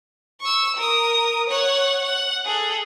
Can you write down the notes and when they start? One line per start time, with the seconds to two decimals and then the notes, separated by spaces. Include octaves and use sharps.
0.41 C#6 E6
0.77 A#4 D#6
1.49 C#5 F#5
2.04 F#5
2.45 G#4 A4